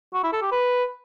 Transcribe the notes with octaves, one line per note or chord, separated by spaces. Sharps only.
F#4
E4
A4
G4
B4